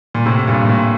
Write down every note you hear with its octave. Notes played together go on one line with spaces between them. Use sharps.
A#2
A2 C3
G2 A#2
A#2
A2